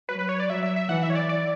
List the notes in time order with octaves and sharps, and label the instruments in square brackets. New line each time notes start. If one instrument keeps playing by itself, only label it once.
[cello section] F#3 [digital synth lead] B4
[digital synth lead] B4
C#5
D5
[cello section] F#3 [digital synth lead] E5
[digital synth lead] E5
E5
[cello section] E3 [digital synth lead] F#5
[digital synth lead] E5
C#5
D5
D5